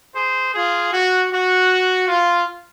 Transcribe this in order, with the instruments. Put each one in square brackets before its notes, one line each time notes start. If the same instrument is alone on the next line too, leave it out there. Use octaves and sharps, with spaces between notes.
[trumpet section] G#4 C5
F4 G#4
F#4
F#4
F4